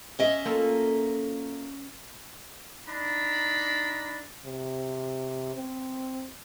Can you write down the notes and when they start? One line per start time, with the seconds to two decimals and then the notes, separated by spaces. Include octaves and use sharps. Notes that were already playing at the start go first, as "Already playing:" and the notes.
0.19 C#4 D#5 E5
0.45 A#3 F4 A4
2.88 D4 D#4 A#5 B5
4.46 C3
5.55 C4